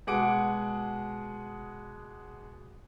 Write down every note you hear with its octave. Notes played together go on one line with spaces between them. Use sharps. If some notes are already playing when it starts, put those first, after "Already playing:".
B2 G#3 G#4 F#5 D6 D7